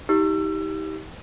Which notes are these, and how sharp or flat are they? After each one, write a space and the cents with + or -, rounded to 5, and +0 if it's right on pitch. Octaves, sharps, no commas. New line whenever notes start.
D#4 +40 G4 +0 E6 +30